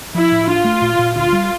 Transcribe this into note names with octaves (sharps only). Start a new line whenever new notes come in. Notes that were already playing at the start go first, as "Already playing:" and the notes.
F3 E4
A2
D4 F4
A3
A#2
A#2
D2 F4
G3